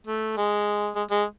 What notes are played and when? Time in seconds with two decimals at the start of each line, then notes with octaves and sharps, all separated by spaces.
0.07 A3
0.37 G#3
0.95 G#3
1.10 G#3